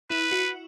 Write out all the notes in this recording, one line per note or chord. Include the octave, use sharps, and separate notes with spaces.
E4 B4
F#4